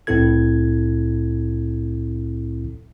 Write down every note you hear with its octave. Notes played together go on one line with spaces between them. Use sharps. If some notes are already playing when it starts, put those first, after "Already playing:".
C2 A2 C4 E4 A4 G#6